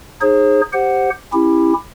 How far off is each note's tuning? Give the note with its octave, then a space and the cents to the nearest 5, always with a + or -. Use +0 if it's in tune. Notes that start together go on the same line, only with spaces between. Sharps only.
D#4 -20 G#4 +0 C5 +45
G4 +0 C5 +0 F#5 +0
C#4 -45 E4 +0 G4 +20